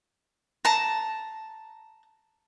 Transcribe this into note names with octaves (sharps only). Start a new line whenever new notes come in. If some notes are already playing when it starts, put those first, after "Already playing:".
A5 A#5